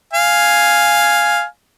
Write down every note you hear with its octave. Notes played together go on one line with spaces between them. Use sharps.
F5 G#5